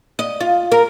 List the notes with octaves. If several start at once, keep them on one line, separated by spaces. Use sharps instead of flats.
D#5
F4
A#4